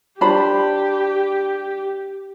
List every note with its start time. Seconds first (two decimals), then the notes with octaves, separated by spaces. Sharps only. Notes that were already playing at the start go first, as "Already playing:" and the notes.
0.21 D4 G4 C5 B5